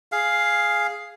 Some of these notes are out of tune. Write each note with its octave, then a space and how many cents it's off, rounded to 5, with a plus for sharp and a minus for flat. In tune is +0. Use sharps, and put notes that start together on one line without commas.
G#4 +0 F5 +0